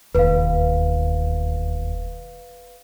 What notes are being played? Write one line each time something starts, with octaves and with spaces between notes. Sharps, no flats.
E1 D#2 B4 F5